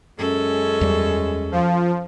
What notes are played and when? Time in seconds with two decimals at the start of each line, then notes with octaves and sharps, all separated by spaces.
0.18 F#2 G#3 C#4 A4
0.81 E2 G3
1.52 F3